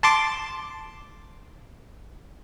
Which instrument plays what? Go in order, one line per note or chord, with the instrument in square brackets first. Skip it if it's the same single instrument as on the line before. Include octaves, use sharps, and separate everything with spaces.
[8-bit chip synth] A5 C6 D6